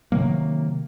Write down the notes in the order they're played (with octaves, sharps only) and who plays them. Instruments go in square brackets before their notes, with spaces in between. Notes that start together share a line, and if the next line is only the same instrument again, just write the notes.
[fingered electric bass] C3 D#3 F#3 A#3